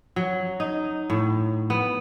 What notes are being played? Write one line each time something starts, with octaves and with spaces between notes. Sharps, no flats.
F#3
D#4
A2
B3